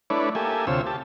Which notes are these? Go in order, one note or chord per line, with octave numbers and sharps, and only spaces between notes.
A3 D4 E4 B4 C#5 D5
A#3 G4 A4 E5 G#5
D2 C3 F4 C5 C#5 E6
G4 A5